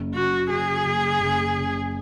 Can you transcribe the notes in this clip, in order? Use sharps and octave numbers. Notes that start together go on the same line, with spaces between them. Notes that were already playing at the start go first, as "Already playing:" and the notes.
Already playing: F#1
F#1 F#4
C#3 G#4
F#1
F#1
C#3